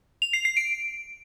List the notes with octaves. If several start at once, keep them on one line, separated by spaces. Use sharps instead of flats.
F7
C7
C7
D7